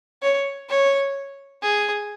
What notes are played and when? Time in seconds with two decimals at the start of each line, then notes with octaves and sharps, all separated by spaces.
0.23 C#5
0.69 C#5
1.62 G#4